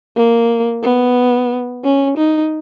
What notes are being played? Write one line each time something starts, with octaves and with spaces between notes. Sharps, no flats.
A#3
B3
C#4
D#4